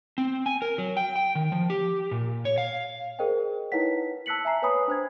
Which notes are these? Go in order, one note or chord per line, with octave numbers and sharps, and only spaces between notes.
C4
G#5
A#4
F#3
G5
G5
D#3
F3
G4
A#2
C#5
F5
G#4 A#4 C5 D#5 G5
D#4 E4 B4 C#5 F#5 B6
A5 E6 F#6 B6 C#7 F#7
E5 G#5 A#5 C7
B4 C#5 G#5 B5 D#6
D4 C5 G#6